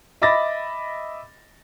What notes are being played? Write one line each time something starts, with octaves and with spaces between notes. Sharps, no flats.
D#5 E5 B5 D6 A6 A#6